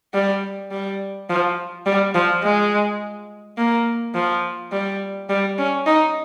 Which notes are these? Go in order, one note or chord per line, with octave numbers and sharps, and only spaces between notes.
G3
G3
F3
G3
F3
G#3
A#3
F3
G3
G3
C#4
D#4